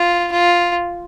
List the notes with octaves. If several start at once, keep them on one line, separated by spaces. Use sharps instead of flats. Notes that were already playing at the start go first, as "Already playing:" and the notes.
Already playing: F4
F4